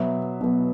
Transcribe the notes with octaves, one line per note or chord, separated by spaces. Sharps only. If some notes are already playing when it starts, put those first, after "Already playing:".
Already playing: B2 F#3 B3 E5
B2 F#3 B3